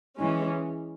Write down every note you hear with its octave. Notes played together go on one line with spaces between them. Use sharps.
E3 G#3 C#4